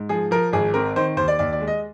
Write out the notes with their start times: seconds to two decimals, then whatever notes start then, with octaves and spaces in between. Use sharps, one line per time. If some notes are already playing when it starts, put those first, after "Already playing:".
Already playing: G#2
0.09 F3 G#4
0.31 F3 A#4
0.53 G#1 G#4
0.74 C4 A#4
0.96 D#3 C5
1.17 D#2 C5
1.28 D5
1.39 D#2 D5
1.53 D5
1.60 G#3
1.67 D#5